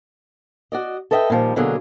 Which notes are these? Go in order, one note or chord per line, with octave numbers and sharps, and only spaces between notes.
F#4 D5 D#5
A4 B4 D#5 E5 F#5 G5
A#2 D#3 F3 G3
B2 D3 F#3 A#3 G#4